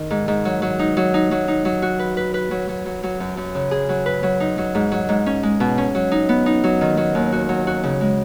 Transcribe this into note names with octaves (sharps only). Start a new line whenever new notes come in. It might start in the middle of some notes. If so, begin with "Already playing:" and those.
Already playing: D#3
G#2
G#2
F#3
F#3
D#4
F#3
D#4
F#3
D#4
F#3
F#4
B4
B4
B4
F#3
F#3
F#3
F#3
F#2
F#2
C#3
G#4
F#3
B4
F#3
D#4
F#3
G#2
F#3
G#2
C#4
G#3
B2
C#4
F#3
D#4
B3
D#4
F#3
D#3
F#3
D#2
F#4
F#3
F#4
C#3
G#3